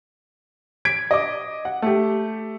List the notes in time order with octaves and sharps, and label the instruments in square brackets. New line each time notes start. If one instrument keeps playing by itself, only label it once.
[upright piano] G#6 B6 D7
D#5 D6
F#5
A3 G4